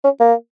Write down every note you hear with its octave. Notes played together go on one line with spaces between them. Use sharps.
C#4
A#3